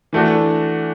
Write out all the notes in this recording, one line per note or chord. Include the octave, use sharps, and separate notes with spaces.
E3 A3 D4 F#4